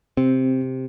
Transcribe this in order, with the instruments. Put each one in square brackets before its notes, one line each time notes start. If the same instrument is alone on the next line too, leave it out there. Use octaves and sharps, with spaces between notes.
[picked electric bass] C3 [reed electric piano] C4